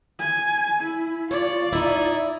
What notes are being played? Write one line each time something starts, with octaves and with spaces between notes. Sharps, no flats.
G#5
E4
F4 C#5 D5
D#4 E4